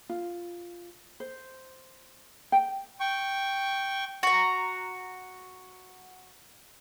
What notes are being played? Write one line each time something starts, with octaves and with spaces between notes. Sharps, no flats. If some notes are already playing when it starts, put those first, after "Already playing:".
F4
C5
G5
G5 C#6
F#4 A#5